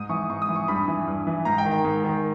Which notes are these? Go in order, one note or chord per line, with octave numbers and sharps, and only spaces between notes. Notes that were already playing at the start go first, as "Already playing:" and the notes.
Already playing: G#2 D#6
E3 C#6
G#2 C#6
D#6
E3
C#6
G2 B5
E3
G2
E3
G#2 A#5
G5
D#3
G5
G#2
D#3